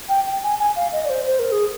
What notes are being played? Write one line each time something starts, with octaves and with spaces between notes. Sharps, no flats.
G5
G5
G#5
G#5
F5
D#5
D5
C5
C5
A#4
G#4